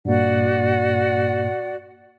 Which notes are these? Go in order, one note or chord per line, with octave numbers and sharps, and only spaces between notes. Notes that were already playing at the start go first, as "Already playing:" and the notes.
G2 A#2 A#3 F#4 D5 F#5